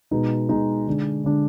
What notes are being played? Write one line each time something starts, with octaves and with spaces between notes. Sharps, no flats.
B2 G#3 D#4
B2 G#3 D#4
D3 G#3 D4
D3 G#3 D4